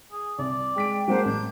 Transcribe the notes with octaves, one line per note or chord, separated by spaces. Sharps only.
G#4
C2 D5
G#3 G5 B6 D7
F#3 G#3 A#3 D4 C5 F#5 G5
A1 G6